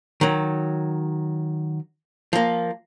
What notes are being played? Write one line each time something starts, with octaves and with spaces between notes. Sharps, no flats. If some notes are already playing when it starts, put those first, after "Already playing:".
D#3 F#3
F3 A#3